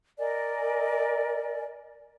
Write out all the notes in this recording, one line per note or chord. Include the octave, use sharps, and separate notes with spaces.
A#4 D5 D#5 G#5